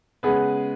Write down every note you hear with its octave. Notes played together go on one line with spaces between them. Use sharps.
C#3 G#3 B3 G#4 B4